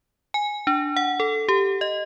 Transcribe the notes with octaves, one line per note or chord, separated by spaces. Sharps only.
G#5
D4
F#5
A4
G4
D#5